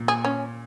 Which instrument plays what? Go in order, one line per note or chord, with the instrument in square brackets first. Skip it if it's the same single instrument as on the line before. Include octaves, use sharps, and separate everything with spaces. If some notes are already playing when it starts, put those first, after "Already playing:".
Already playing: [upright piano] A#2
[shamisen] G#4
C#4